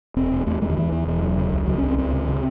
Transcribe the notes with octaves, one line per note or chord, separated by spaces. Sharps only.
E1 C4
E1
E2 A3
E2 G#3
D#3
E2 E3
E2
E1 E3
E1 F#3
C#3
C#2
C#2 F#3
C#4
C#2 C4
C#2 C4
C#3
C#3